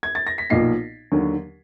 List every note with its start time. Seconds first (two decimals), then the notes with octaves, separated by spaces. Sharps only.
0.03 G#6
0.15 A6
0.27 A#6
0.38 B6
0.50 B1 A#2 F3 A#3 D#4 C7
1.12 D#2 D3 F#3